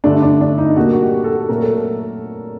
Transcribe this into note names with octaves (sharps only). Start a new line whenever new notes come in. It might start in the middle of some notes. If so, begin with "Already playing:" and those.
G2 D3 A3 D4
D4
D4
D#4
A#2 G3 A#3 F#4
F#4
G4
A4
A#2 F#3 A3 A#4
A4